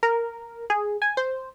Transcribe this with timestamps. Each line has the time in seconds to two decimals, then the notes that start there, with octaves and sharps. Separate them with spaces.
0.03 A#4
0.70 G#4
1.02 G#5
1.17 C5